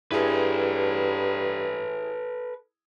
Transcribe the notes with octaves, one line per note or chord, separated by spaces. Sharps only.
G2 E4 G#4 A4 B4